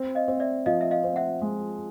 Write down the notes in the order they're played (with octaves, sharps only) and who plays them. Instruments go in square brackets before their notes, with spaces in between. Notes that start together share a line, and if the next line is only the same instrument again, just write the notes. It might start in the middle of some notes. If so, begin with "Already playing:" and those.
Already playing: [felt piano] C4
[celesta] D#5 F5
[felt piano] C4
[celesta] D5 E5
[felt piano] F3 [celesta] D#5 F5
[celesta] E5
D#5 F5
[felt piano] C4
[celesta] E5 F#5
[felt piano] G#3